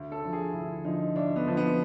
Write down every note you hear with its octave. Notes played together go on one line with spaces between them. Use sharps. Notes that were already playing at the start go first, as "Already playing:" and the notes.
Already playing: D2
A4
D3 F3
G#4
D2 E4
D3 F3 D#4
D2 D4
B3
D3 F3
B3